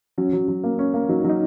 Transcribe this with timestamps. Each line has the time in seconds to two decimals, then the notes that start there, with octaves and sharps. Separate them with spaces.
0.18 F#3 C#4
0.33 F#3
0.48 F#3
0.64 A#3
0.79 C#4
0.94 A#3
1.09 F#3 D#4
1.19 C#4
1.24 F#3 D#4